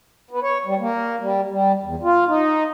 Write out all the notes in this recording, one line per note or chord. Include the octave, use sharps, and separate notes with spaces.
B3
C#5
G3
A#3
G3
G3
E2
F4
D#4